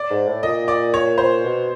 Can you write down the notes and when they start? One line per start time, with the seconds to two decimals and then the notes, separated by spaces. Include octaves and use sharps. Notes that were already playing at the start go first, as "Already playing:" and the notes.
Already playing: D5
0.10 G#2
0.27 A2
0.43 A#2 D#5
0.68 D5
0.94 C#5
1.18 C5
1.44 B2